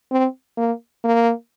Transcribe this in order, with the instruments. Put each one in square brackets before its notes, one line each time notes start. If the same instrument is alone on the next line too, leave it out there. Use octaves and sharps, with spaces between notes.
[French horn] C4
A#3
A#3